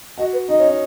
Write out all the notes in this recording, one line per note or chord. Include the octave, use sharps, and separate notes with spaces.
F#4 D#5
B4
D#4 D#5
C#4
D#4